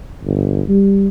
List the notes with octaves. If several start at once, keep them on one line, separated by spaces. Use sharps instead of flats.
G1
G3